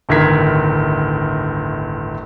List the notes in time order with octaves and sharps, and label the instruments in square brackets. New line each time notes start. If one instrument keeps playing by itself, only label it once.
[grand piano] D1 G1 D#3 A#4 G#6 B6